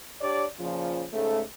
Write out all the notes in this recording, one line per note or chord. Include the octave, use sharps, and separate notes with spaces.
D4 G4 C#5 D5
A#2 C#3 F3
G#2 C#3 A3